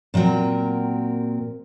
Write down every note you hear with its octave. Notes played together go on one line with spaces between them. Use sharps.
A#2 F#3 C4 A#4 G5